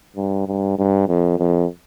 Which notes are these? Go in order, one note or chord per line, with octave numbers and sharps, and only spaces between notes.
G2
G2
G2
F2
F2